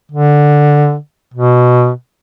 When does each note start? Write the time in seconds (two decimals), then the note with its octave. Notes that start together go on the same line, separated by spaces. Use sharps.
0.11 D3
1.34 B2